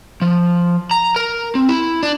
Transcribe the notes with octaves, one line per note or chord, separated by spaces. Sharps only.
F3
A#5
A#4
C4
E4
D4